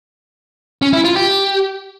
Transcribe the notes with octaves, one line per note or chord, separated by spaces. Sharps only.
C#4
E4
F4
G4